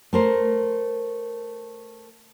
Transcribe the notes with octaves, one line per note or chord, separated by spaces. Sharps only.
A3 A#4 C5